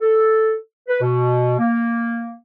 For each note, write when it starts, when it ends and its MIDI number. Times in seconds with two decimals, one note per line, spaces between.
0.01 0.54 69
0.88 1.01 71
1.01 1.58 47
1.59 2.35 58